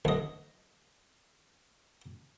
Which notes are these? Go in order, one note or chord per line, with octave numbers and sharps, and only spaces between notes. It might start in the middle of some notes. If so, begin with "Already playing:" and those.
D2 D#5